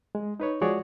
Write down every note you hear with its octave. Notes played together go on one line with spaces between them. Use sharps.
G#3
D#4 B4 C#5
F3 G#3 F#4 G#4 C#5 D5